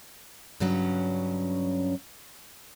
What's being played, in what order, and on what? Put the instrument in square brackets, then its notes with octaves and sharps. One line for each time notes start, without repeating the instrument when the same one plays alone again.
[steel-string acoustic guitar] G2 C#3 F#3 C#4